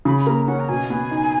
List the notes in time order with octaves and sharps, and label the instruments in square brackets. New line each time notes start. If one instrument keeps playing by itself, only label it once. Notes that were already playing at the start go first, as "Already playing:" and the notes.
[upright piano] C#3 [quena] B5
[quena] B5
[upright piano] A#3 [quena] A#5
[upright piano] C#4 [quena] F#5
[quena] A#5
[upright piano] B2 [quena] G#5
[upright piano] B3
D#4